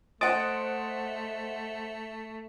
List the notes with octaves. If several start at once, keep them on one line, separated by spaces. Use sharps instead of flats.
A3 C5 D#5 F#5 D#6 A6 D7